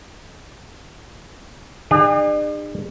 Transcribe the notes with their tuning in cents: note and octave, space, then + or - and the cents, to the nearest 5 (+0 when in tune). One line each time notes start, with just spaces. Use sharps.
D4 +45 G#4 -45